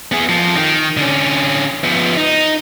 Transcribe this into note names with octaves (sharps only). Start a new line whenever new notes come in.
B3 G#4
F2 F3
D#3
D3 C#4
F3 B3
D#4